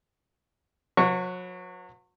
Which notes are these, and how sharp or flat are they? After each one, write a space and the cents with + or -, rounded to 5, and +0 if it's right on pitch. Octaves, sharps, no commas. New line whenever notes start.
F#3 -35 B4 +0 C#6 +0